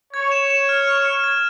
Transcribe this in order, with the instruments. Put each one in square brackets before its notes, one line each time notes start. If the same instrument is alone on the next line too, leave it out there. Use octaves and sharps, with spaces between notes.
[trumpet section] C#5 [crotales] G#6
[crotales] E7
E7
F6
F6
F6
G#6